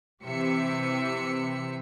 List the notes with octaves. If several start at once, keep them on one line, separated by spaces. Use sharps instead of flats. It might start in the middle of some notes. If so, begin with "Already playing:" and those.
C3 E3 G4 E5 C#7